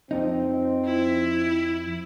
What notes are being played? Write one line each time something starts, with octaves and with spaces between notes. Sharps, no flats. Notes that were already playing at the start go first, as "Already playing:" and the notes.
F2 F3 C4 D#4
E4